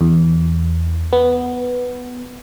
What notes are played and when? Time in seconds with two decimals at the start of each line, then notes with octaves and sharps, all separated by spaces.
0.01 E2
1.13 B3